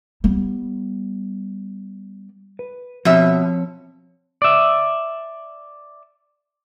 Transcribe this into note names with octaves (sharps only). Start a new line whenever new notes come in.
G3 B3
B4
B2 F3 C4 C#5 E5
D5 E5